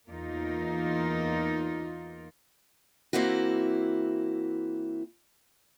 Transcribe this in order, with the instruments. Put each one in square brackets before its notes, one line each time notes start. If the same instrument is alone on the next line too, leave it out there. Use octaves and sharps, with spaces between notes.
[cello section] E2 A#3 D#4 F4 A#4
[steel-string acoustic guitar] E3 A#3 C4 E4 F#4